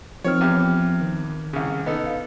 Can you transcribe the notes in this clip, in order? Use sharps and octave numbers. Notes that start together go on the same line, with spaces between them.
D#3 F3 C4 C#5 F6
E2 G4
D#3
C2 C#3
B3 D#4 A4
F5